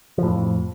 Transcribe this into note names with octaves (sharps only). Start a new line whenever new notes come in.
F2 A2 F3